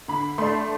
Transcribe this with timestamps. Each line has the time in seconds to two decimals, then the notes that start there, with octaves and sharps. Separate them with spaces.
0.08 D3 B5
0.38 A3 D4 C6